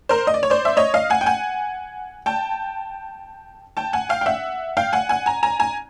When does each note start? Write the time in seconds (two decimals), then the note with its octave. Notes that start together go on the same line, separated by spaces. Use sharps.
0.09 A#4 C5
0.27 D#5
0.34 D5
0.43 C#5
0.50 C5 D5
0.65 E5
0.77 C#5 D#5
0.94 D#5 F5
1.10 F#5 G#5
1.21 G5
1.26 F#5 G#5
2.26 G5 A5
3.77 G5 A5
3.93 F#5 G#5
4.09 F5 G5
4.21 G5
4.26 E5 F#5
4.77 F5 G5
4.93 F#5 G#5
5.09 F#5 G#5
5.26 G#5 A#5
5.43 G#5 A#5
5.59 G#5 A#5